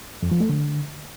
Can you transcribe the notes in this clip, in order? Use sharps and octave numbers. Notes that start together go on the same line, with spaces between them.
F2
F3
A3
D3